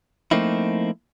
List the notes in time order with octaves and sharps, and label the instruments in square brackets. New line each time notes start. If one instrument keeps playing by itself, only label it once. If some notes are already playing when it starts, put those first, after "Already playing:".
[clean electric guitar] F3 A3 A#3 C4 D#4 E4